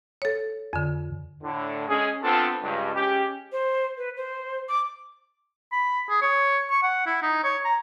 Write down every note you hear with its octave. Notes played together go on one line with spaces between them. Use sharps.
A4 C#5
F2 D3
A2 D3
G#3 C#4 G#4
B3 C4 D4 F4 A4
C#2 G2
G#3 C#4 G4
C5
B4
C5
D6
B5
G#4
C#5
C#6
F#5
E4
D#4
C#5
A#5